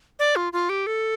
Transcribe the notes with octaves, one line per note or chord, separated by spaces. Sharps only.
D5
F4
F4
G4
A4